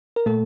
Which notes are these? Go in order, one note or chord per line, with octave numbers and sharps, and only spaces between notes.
A#4
A#2 A3 A4